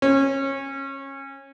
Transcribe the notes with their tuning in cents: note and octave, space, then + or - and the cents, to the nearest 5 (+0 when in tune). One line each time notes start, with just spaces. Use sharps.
C#4 -25